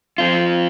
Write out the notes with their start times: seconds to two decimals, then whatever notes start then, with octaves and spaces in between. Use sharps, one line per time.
0.18 F3 C4 F4